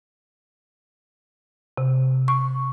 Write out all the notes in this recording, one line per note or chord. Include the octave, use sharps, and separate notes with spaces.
C3
C#6